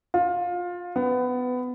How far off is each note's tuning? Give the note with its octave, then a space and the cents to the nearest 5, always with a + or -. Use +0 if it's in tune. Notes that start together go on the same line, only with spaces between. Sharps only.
F4 +20
B3 +20